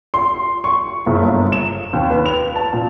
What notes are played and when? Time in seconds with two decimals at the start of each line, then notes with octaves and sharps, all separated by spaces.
0.14 C6
0.64 C#6
1.06 F#1
1.21 G1
1.52 E7
1.93 D#2
2.10 B4
2.26 F7
2.56 A5
2.73 A#2